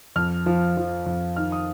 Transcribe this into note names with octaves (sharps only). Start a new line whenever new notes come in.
F2 F6
F3
F3
F2
D#3 F6
D#6